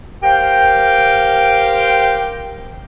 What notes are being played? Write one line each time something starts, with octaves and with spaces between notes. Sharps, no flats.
G4 A#4 C5 F5 G5